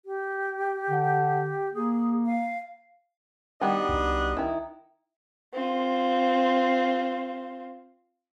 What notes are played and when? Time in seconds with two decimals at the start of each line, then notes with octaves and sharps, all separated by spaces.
0.06 G4
0.90 D3
1.74 A#3 G#4
2.26 F5
3.61 D#3 F#3 G3 B3 D4 D#5
3.89 C2
4.37 D#3 E4
5.54 C4 F4